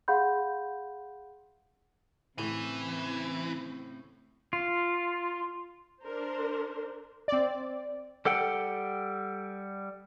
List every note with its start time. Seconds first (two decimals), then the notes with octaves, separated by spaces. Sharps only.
0.08 G#4 F5 F#5 B5 C6 G6
2.38 A2 C#3 E3 C4 D#7
4.53 F4
6.03 D4 A#4 C5
7.28 C4 D5
8.25 G3 A4 F#5 G5